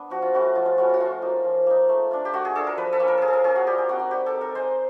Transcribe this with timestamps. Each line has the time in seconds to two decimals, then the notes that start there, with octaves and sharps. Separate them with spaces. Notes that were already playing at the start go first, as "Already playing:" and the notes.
Already playing: B3 D4
0.10 F3 F#4
0.22 F4
0.34 A3 C#4 E4 F#4
0.55 F3 F4
0.66 F4
0.78 A3 C#4 E4 F#4
0.89 F4 F#4
0.99 F3 F4
1.22 A#3 D#4
1.45 F3
1.67 A#3 D#4
1.89 A3
2.11 D4 F4
2.25 G4
2.33 A3 F#4
2.45 G#4
2.55 D4 F4 A4
2.67 A#4
2.77 F3 B4
2.93 A4
3.00 A#3 C#4 F4
3.08 A#4
3.18 F3 G#4 A4
3.28 A4
3.33 A#4
3.44 A#3 C#4 F4 G#4
3.56 F#4
3.67 G3 G4
3.78 G4
3.88 C4 D#4 F#4
3.99 F#4
4.11 G3 G4
4.26 A4
4.33 C4 D#4
4.41 A#4
4.55 G#3 C5